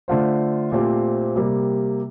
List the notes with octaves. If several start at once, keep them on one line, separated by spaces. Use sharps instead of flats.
D3 A3 D4 F4 C5
A#2 A3 C4 G4 C5
C3 G3 A#3